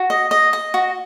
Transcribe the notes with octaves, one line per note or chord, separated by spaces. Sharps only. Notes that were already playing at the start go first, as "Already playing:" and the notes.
Already playing: F#4
D#5
D#5
D#5
F#4